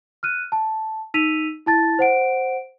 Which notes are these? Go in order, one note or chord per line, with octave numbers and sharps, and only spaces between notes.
F6 F#6 D#7
A5
D#4 E6 B6 D#7 F7
E4 A5 A6
C5 F#5 D7